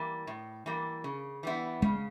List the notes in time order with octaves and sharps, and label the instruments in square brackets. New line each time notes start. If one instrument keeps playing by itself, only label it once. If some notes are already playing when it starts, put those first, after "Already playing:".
Already playing: [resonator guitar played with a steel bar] E3 G3 A#3
A2
E3 G3 A#3
C#3
E3 G3 B3 E4
[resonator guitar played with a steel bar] C#3 [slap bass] G#3